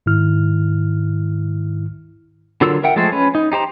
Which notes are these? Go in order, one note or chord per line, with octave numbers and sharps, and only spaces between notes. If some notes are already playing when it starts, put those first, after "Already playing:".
G#2 D#3 E4 F6
D3 F#3 F4 A#4 E6
A#4 E5 F#5 G5
F3 G#3 A3 A4 C5
C#4 B4
D#4
D#4 G4 C5 A#5